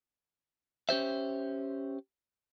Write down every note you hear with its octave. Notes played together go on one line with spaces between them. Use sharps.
C#4 G4 C5 E5